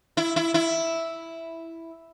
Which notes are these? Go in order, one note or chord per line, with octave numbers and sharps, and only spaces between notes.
E4
E4
E4